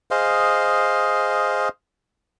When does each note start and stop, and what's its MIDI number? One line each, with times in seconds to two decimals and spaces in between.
0.11 1.69 68
0.11 1.69 72
0.11 1.69 75
0.11 1.69 77